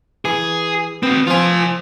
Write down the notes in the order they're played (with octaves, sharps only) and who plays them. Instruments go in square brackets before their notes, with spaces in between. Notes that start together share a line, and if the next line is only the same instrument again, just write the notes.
[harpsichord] E3 [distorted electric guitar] G#4
[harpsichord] B3 [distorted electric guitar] C4 F#4
[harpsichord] F3 C5 [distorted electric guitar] F4 G#5